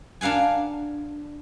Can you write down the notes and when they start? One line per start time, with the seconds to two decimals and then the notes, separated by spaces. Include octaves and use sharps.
0.21 D4 A#4 F5 F#5 G#5